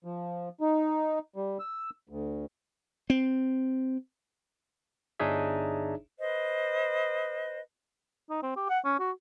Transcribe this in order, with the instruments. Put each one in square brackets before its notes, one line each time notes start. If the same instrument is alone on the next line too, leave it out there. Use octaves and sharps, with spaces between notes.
[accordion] F3
D#4
G3
E6
D2
[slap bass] C4
[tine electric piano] G1 D4 D#4 G#4 C#5 E5
[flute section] B4 C5 D#5
[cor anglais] D#4
C4
G4
F#5
C#4
F#4